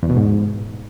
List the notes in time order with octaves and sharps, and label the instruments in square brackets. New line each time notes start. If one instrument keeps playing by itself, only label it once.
[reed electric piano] E2
B2
G#2